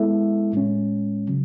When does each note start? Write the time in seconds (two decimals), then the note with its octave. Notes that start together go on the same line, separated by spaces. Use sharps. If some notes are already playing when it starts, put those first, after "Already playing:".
Already playing: G#3 B3 E4 A4 E5
0.53 A2 G#3 C#4
1.28 C#3 F#3